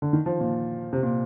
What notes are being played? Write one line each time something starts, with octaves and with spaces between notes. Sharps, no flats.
D3
D#3
F3
A#2
C3
A#2